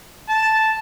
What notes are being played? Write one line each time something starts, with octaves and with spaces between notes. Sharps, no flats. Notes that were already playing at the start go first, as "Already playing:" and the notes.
A5